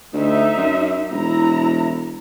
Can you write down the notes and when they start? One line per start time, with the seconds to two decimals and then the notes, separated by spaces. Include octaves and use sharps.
0.14 D2 D#4 E5
0.57 F#2
1.10 E1 E4 A#5